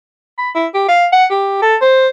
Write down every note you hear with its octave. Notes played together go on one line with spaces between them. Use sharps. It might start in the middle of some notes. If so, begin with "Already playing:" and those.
B5
E4
G4
F5
F#5
G4
A4
C5